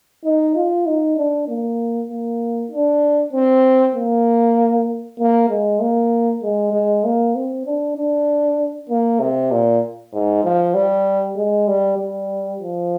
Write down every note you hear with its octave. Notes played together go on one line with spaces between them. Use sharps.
D#4
F4
D#4
D4
A#3
A#3
D4
C4
A#3
A#3
G#3
A#3
G#3
G#3
A#3
C4
D4
D4
A#3
C3
A#2
G#2
F3
G3
G#3
G3
G3
F3